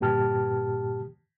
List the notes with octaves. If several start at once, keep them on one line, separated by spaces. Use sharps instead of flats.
D2 G2 A#2 G4 A5 F6